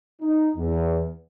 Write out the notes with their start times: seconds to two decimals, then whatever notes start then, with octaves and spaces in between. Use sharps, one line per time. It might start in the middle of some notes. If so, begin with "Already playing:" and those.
0.21 D#4
0.56 E2